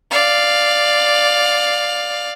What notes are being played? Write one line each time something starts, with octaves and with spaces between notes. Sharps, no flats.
D5 F5